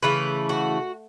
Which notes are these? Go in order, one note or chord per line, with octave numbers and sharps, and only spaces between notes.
C#3 E3 A3 B4
F#4